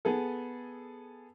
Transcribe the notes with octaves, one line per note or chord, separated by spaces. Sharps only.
B3 G#4 A4